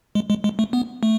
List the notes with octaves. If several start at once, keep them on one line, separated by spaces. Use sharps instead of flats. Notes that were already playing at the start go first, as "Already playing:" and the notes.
G#3
G#3
G#3
A3
B3
A3